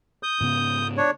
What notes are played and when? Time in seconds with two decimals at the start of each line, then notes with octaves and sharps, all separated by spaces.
0.23 D#6 G6
0.41 G#2 C#3 B3
0.97 D4 C#5